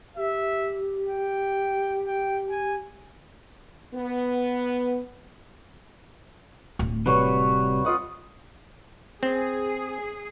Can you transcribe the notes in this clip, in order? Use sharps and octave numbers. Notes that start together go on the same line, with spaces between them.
G4 E5
G5
G5
G#5
B3
D1
C3 G3 F#4 B4 C#5
F4 D#5 F#5
C4 G#4